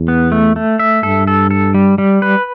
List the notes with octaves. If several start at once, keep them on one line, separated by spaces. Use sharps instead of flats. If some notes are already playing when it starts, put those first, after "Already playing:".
Already playing: E2
B3
A3
A3
E5
G2 A4
A4
A4
G3
G3
B4